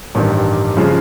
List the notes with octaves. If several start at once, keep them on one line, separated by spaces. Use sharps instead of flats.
A1 G2 D#3 G3
C#3 F3 G#3